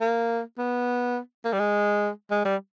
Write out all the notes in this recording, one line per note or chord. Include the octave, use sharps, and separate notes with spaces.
A#3
B3
A#3
G3
G#3
G#3
G3